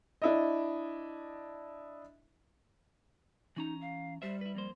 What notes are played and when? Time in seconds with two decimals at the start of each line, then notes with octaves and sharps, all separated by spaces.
0.22 D4 E4 D#5
3.56 E3 C#4 D#4 A#5
3.81 F5
4.22 G3 G4 C5 E5
4.41 E4 B4
4.55 F2 A#3 C5